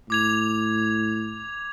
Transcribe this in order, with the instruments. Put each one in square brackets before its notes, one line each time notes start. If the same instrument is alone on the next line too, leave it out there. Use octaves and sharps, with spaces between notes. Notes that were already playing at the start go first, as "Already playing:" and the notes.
[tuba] A2 [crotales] D6 G#6 F7